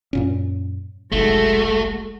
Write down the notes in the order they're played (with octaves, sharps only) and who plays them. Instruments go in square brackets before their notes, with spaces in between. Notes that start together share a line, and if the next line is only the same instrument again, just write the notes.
[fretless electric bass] F#2 A#2 C#4
[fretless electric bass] F1 B1 [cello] G#3 F#4 [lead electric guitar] A3